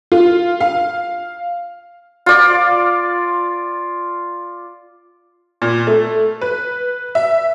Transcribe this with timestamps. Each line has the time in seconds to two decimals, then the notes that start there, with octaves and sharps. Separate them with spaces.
0.12 F4
0.60 F5
2.26 F4 D5
5.62 A#2
5.87 A3
6.41 B4
7.15 E5